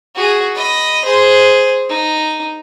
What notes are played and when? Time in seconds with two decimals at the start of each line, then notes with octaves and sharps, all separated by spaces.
0.15 F#4 G#4
0.55 D#5 B5
1.05 G#4 C5
1.89 D#4